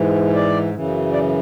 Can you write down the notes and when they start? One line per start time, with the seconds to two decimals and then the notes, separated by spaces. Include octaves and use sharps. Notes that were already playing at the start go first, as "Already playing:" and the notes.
Already playing: G#2 E3
0.35 D5
0.74 F#2 C#3 E3
1.13 D5